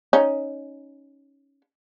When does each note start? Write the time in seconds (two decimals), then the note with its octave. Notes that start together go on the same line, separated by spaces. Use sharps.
0.13 C#4 D#4